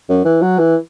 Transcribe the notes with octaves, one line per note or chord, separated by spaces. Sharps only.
F#2
E3
F#3
E3